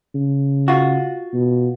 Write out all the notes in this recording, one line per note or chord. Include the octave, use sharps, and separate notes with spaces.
C#3
F4 F#4
B2